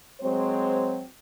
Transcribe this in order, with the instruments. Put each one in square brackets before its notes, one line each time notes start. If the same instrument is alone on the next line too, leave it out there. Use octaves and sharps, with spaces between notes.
[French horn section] F#3 G#3 C4 C5